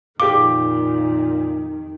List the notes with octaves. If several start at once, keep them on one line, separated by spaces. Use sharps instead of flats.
F2 A#2 D#3 G4 F5 D6